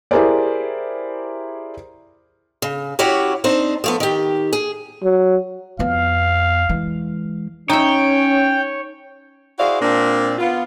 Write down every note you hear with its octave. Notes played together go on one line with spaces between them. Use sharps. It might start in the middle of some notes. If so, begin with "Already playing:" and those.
E4 G4 G#4 A#4 C5 D5
C#3
C#4 E4 F#4 G4 C#5
C4 D4 D#4 C5
F3 A3 B3
D#3 G4
G#4
F#3
F2 B3 F5
E3 G#3
C#4 D#4 C#5 E5 G5
E4 F#4 G#4 C5 D5 F5
A#2 A#3 C4 D4
B3 F4